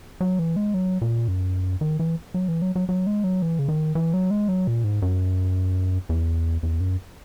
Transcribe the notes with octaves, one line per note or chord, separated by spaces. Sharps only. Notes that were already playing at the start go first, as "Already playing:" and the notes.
F#3
E3
G#3
F#3
A#2
F#2
D#3
E3
F#3
E3
F#3
F#3
F#3
G#3
F#3
E3
C#3
D#3
E3
F#3
G#3
F#3
A#2
G#2
F#2
E2
E2
F#2